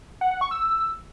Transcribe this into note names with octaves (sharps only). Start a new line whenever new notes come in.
F#5
F#5
C#6
E6